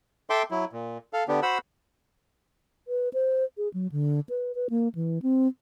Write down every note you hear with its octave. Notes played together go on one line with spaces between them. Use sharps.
A4 E5 G5 C6 D6
F#3 E4
A#2
A4 F5
D3 B3 D4 G4
F#4 C5 F#5 B5 E6
B4
C5
G#4
F#3
D3
B4
B4
A#3
E3
C4